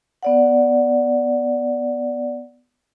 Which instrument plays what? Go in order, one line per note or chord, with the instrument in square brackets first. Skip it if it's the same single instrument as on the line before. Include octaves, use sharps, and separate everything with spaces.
[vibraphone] B3 D5 F#5